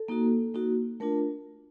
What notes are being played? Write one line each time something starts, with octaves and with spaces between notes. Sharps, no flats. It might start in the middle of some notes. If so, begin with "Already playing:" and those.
Already playing: A4
A#3 D#4 F#4
A#3 D#4 F#4
A3 D4 F4 A#4